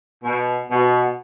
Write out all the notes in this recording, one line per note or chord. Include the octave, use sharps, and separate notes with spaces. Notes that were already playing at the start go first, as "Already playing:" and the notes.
B2
B2